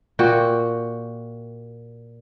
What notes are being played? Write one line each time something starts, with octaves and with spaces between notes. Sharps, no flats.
A#2 F#4 G5